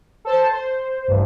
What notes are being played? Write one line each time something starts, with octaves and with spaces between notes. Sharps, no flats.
A4 C5 A5
C5
A1 G2